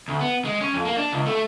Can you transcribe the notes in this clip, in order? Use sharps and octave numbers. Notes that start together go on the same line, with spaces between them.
D2
B3
G#3
C#4
F2
A#3
D4
C#2
A3